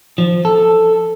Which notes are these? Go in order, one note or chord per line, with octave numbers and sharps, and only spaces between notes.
F3
A4